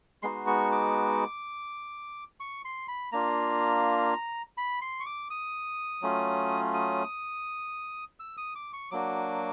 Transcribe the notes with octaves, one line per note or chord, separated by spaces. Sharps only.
G#3 B3 D#4 F#4 C6
C#6
D6
C#6
C6
B5
A#3 D4 F4 A#5
B5
C6
C#6
D6
D#6
F#3 A3 C#4 F4
D#6
E6
D#6
D6
C#6
F#3 A#3 D4 F#4 D6